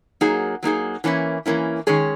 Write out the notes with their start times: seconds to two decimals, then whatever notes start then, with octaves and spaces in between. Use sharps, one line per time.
0.21 F#3 A#3 D#4 G#4
0.63 F#3 A#3 D#4 G#4
1.04 E3 A#3 C#4 E4
1.46 E3 A#3 C#4 E4
1.87 D#3 G#3 C#4 G#4 C#5